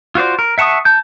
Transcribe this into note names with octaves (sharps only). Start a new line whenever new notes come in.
F4 F#4 C5 D5
A#4
E5 F#5 A5 C#6 D#6
A5 G6